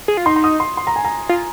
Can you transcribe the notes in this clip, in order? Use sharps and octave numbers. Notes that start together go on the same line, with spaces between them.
G#4
F4
D#4 C6
C6
D#6
C6
C6
A#5
G#5
A#5
F4